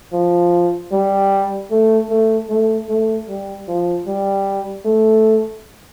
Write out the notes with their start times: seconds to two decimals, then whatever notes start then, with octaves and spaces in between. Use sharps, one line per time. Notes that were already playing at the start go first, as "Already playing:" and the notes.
0.13 F3
0.92 G3
1.71 A3
2.10 A3
2.49 A3
2.89 A3
3.28 G3
3.68 F3
4.07 G3
4.85 A3